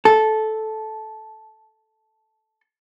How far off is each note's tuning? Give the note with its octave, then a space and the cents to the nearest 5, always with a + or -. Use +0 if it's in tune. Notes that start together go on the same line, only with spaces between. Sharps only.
A4 -10